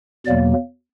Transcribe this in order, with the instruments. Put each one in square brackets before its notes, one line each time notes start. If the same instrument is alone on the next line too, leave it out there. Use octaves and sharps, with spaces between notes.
[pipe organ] E2 B2 F#3 A#3 D5